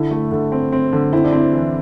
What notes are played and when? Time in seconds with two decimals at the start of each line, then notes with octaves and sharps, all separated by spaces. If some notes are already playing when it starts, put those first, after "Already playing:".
Already playing: D3 E4
0.11 A3
0.32 D3
0.52 C4
0.72 C4
0.93 D3
1.13 C4 E4
1.25 D4
1.33 C4 E4
1.53 E3